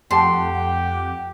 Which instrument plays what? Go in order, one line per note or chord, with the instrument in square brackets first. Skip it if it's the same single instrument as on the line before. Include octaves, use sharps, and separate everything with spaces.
[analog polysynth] F2 F#5 [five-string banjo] A3 A5 [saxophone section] G4 [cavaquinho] C6